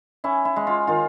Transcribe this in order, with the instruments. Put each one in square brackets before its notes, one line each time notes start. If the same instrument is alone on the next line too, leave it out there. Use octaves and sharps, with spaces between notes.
[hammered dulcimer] C#4 E4
E4
G#3
F4
D#3 F4